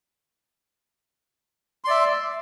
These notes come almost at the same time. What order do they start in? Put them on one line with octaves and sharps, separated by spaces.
C6 D5 E5